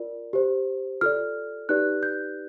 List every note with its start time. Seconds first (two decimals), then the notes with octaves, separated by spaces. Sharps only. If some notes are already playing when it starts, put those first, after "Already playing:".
Already playing: F4 A#4 D5
0.33 G4 C5
1.01 F4 A4 D5 F6
1.69 D#4 G4 B4 D5 F#6
2.03 G6